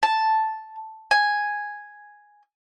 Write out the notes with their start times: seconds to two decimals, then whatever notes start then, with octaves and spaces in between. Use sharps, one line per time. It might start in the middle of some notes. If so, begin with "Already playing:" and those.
0.03 A5
1.11 G#5